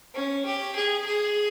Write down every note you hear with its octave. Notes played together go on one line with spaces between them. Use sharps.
C#4
G4
G#4
G#4